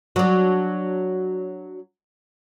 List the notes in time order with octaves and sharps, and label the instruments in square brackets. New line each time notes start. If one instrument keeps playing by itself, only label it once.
[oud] F#3 D4